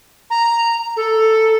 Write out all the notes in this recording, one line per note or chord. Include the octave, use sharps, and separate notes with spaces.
A#5
A4